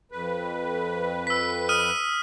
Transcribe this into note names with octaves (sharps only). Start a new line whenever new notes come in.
F2 B4
E6 B6
D#6 F6 D#7